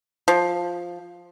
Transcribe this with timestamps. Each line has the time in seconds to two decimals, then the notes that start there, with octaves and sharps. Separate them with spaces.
0.28 F3